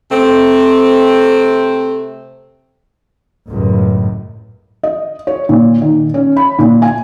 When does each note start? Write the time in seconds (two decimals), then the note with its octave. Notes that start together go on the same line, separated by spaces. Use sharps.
0.10 C3 A3 C4
3.49 C#2 F#2 A2
4.83 D#5
5.27 C#5
5.49 A#2
5.82 D#3
6.14 C#4
6.37 B5
6.59 A#2
6.82 G#5